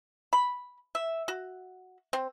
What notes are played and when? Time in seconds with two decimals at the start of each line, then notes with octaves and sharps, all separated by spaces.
0.33 B5
0.95 E5
1.28 F#4
2.13 C4